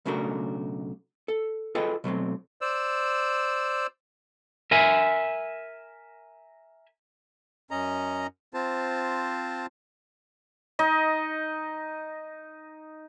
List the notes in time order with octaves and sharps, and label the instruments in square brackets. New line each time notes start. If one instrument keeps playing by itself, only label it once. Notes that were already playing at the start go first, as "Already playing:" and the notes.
[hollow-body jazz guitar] B1 C#3 A3 D4 F#4 A#4
A4
F4 G#4 A4 B4 D#5 G5
B2 F#3 A3 C4
[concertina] C5 D5 E6
[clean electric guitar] A#4 E5 G#5
[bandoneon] F#2 C#4 D#5 A#5
C4 F4 C5 A5
[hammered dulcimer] D#4 D#5